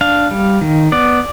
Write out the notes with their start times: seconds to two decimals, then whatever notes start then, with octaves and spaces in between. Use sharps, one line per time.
0.01 D4 F5
0.31 G3
0.61 D#3
0.92 B3 D5